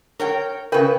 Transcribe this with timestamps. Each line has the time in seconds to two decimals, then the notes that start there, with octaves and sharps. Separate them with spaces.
0.19 A#4 C#5 G5
0.72 C#3 A#4 B4 C#5 G5